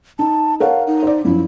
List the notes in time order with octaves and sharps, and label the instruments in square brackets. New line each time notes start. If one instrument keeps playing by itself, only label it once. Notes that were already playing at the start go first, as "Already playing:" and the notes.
[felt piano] D#4 [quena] A5
[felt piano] A#4 C#5 F#5 [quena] F5
[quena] D#4
[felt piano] C5 D5
[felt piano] F#2 F3 [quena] E4